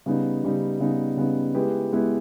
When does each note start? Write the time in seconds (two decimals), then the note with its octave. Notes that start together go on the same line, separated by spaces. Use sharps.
0.06 C#3 G3 B3 D#4
0.44 C#3 G3 B3 D#4
0.80 C#3 G3 B3 D#4
1.17 C#3 G3 B3 D#4
1.54 G#3 B3 E4 G4 B4
1.92 G#3 B3 E4 G4 B4